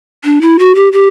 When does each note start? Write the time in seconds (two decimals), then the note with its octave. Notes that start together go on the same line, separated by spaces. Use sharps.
0.24 D4
0.41 E4
0.59 F#4
0.75 G4
0.93 G4